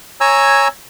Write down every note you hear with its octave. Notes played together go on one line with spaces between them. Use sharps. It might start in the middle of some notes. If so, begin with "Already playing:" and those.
C#5 G#5 A#5 E6